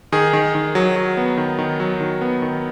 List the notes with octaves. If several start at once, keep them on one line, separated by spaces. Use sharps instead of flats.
D#3 G#4
D#3
D#3
F#3
F#3
B3
D#3
D#3
F#3
D#3
B3
D#3